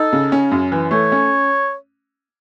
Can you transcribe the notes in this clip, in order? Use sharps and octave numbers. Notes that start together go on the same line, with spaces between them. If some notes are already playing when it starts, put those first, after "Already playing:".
Already playing: D#4 A4
C#3
C#4
F#2
E3
A3 C#5
C#4